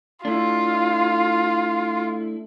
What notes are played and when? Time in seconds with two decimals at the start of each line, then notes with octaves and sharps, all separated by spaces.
0.25 A3 D4 E4 F4